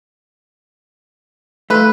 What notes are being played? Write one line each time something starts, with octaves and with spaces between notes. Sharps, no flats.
A3 F4 B4